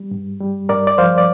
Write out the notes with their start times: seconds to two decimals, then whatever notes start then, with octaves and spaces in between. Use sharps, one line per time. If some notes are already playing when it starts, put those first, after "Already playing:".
Already playing: G3
0.11 G2
0.40 G3
0.69 G2 A#4 D5
0.87 D5
0.98 F3 C5 F5
1.18 D5